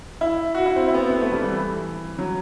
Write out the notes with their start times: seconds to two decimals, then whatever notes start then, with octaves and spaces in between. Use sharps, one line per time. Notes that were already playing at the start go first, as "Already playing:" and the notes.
0.21 E4
0.55 F#4
0.66 E4
0.76 C4
0.88 E4
0.94 B3
0.98 C4
1.10 B3
1.21 A3
1.32 G3
1.42 E3
2.18 F#3